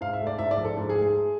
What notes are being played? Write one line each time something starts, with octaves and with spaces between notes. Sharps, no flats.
G#2 F5
E5
A3
D5
G#2 E5
D5
F3
A4
G#2
G#4
A3
G#4